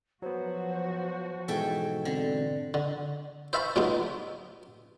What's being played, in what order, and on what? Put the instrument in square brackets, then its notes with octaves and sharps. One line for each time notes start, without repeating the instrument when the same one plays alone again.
[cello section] F3 F#4 [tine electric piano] F#3 B3 [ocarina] C5
[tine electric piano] G#2 B2 E3 [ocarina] G#4 [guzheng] A4 E5 G5
[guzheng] D3 [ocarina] C4
[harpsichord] D3
C5 E5 F5 A5 B5 C#6
A2 F#3 G#3 B3 D#4 F4